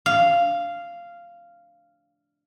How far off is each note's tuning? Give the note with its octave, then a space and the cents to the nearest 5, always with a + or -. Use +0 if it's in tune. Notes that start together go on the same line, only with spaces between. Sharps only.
F5 -10